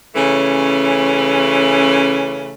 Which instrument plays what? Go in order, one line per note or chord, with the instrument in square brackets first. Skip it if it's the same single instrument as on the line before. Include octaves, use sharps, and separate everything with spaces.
[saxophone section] C#3 E3 A3 C#4